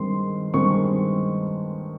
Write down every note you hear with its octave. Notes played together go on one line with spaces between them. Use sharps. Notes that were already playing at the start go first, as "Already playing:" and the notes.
Already playing: G2 D#3 G#3 C4 C6
G2 D#3 G#3 C4 C#6